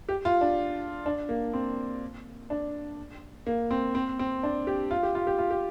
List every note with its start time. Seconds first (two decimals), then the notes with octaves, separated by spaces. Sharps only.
0.09 G4
0.25 F4
0.41 D4
1.06 D4
1.29 A#3
1.53 C4
2.50 D4
3.47 A#3
3.71 C4
3.95 C4
4.19 C4
4.43 D4
4.67 G4
4.91 F4
5.03 G4
5.15 F4
5.27 G4
5.39 F4
5.50 G4